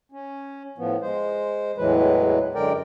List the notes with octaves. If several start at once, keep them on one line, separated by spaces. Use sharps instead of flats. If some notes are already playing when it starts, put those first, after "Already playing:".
C#4
A2 F3 B3
G#3 C5
E2 A2 E3 F#3 G#3 B4
F#2 D3 G#3 A#4 D5 G5